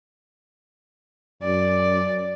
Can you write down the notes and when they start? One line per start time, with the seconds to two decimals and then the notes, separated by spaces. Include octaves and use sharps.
1.43 F#2 D5